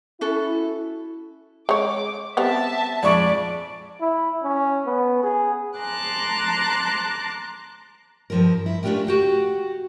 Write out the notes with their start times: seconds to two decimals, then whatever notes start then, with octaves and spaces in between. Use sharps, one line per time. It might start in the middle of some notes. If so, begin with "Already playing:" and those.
0.21 C#4 E4 F#4 A4
1.69 G#3 C#5 D6
2.37 G3 B3 C4 E5 A5
3.03 F2 G#3 D5 C#6
4.01 E4
4.43 C#4
4.86 B3
5.23 G#4
5.80 A5 A#5 C6 D6 F#6
8.30 G2 F3 A#4
8.66 E4
8.83 A3 C#4 D4 F4 G4 A#4
9.07 F#4 G4 F#5